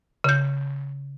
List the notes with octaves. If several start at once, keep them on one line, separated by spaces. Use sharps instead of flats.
C#3 G6